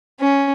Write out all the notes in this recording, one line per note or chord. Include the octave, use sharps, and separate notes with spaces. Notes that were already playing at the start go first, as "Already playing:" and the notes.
C#4